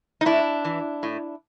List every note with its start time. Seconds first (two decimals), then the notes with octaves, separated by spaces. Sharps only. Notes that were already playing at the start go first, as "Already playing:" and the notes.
0.21 D#4
0.25 A2 D4 E4
0.65 E3
1.03 A2